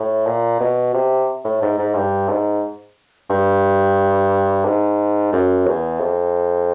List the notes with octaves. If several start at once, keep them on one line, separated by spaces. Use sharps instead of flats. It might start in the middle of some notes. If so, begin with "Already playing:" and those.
Already playing: A2
A#2
B2
C3
A2
G#2
G#2
G2
G#2
G2
G#2
F#2
E2
F2